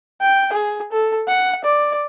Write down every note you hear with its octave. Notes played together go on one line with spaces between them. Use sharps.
G5
G#4
A4
F#5
D5